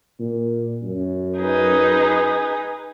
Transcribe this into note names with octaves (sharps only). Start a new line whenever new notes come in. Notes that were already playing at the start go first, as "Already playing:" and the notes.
A#2
F#2
D#4 G#4 B4